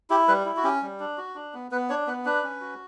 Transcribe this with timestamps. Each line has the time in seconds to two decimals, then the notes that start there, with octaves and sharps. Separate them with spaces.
0.10 E4 G4
0.28 G3 B4
0.46 E4
0.57 F#4
0.64 C#4 G4
0.82 G3
1.00 D4
1.18 F#4
1.35 D4
1.54 B3
1.72 B3 B4
1.90 D4 C#5
2.07 B3 B4
2.25 D4 B4
2.44 C#4
2.61 F#4